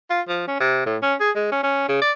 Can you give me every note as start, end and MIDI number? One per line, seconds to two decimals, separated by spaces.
0.10 0.21 65
0.28 0.46 53
0.48 0.57 61
0.60 0.82 48
0.86 0.97 45
1.02 1.15 61
1.20 1.30 68
1.35 1.49 56
1.52 1.62 61
1.63 1.85 61
1.89 2.00 49
2.02 2.12 74